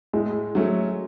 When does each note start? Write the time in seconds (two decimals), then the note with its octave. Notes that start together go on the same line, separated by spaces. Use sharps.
0.13 A2 G#3
0.55 F#3 A3 C#4